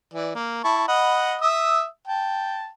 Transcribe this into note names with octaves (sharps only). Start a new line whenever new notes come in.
E3 D5
A#3
E4 A5 C#6
D#5 F#5 B5
E5 D#6 E6
G5 A5